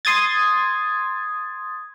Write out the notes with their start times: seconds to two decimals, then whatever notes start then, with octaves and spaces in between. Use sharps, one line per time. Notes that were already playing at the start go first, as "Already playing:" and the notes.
0.05 C6 D#6 G#6 A6